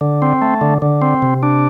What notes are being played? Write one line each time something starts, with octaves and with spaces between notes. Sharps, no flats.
D3
C4
A3
D3
D3
C4
C3
D4